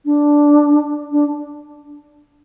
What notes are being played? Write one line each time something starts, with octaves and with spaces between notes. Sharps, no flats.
D4
D4